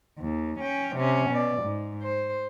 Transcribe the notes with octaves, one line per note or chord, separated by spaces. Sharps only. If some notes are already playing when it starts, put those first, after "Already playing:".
D#2
C#4 G5
C3 C#4
B2 D5
G#2
C5